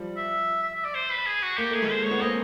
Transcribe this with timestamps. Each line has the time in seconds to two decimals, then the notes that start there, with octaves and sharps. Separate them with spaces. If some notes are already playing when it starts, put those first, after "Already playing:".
Already playing: F3 G3
0.17 E5
0.63 E5
0.74 E5
0.84 D5
0.95 C5
1.11 B4
1.26 G#4
1.43 F#4
1.57 A#3 G4
1.71 A3 G#4
1.82 G#3 A#3
1.90 C5
2.05 C#5
2.11 B3
2.21 A#3 C4 D#5